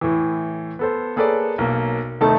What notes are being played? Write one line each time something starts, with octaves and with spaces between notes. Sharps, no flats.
A2 E3
B3 A4 C5
A#3 G#4 A4 B4 C#5 D5
B1 A#3
F1 D#3 A3 D#4 A5